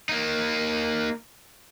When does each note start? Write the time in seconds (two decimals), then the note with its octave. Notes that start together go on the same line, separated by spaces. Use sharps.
0.09 A#3 D#4